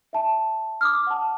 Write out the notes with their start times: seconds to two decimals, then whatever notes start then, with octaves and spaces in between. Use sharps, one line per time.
0.13 E5 A5
0.81 D6 D#6 F6
1.07 F#5 A5